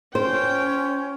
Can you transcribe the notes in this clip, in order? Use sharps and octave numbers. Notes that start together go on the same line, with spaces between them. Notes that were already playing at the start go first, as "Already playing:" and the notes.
C#4 F4 C5 G5